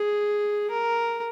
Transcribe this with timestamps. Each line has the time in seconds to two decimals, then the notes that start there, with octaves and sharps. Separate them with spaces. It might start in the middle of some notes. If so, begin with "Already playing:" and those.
Already playing: G#4
0.71 A#4